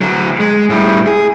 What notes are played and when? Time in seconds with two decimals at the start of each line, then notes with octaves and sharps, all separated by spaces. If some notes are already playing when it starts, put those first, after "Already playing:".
0.01 D2 F#3
0.40 G#3
0.70 A2 G3
1.07 G#4